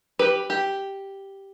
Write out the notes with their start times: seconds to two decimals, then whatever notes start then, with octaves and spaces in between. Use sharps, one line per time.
0.19 G4 B4
0.50 G4